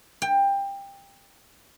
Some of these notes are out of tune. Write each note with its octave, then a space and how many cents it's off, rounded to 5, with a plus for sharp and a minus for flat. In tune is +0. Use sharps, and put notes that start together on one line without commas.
G5 +20